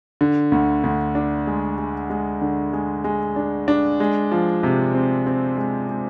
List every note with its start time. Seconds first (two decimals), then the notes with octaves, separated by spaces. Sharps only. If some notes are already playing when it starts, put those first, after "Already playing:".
0.21 D3
0.52 D2
0.83 D2
1.15 D4
1.47 G#3
1.78 G#3
2.10 G#3
2.41 D3
2.73 G#3
3.04 G#3
3.36 D4
3.68 D4
4.00 G#3
4.31 F3
4.63 C3
4.95 C4
5.27 C4
5.57 G#3
5.89 G#3